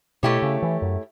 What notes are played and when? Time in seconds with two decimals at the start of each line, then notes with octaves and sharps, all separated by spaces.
0.23 B2 A3 E4 G4 C#5
0.42 C#3
0.63 E3
0.82 F#2